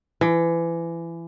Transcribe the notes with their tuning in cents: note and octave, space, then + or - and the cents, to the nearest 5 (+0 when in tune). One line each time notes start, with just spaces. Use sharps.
E3 +25